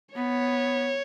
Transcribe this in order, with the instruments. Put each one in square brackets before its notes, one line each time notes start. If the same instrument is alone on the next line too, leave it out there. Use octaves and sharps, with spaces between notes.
[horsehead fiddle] B3 [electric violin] C#5